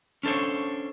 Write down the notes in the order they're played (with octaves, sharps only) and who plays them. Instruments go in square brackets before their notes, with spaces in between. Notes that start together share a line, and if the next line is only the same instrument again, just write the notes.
[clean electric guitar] C#4 D4 A4 C5 C#5